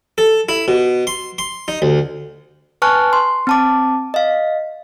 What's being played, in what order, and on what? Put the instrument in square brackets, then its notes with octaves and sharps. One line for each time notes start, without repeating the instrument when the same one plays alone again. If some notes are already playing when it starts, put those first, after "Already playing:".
[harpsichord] A4
E4
B2
C6
C6
D#4
D2
[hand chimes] B4 G#5 A5 C#6 F6 F#6
C6
C4 A5 D6
D#5 F5